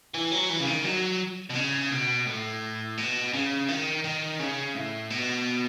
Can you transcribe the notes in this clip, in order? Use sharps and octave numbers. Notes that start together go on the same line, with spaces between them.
E3
F#3
E3
C#3
D#3
F#3
B2
C#3
B2
A2
B2
C#3
D#3
D#3
C#3
A2
B2